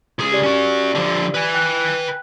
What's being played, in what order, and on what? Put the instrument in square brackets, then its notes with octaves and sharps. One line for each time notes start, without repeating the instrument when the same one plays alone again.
[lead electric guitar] C#2 G#4
[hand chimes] G4 D5
[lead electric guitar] C#4 F#4
D3 F3
B4 G#5
[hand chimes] G5 F#6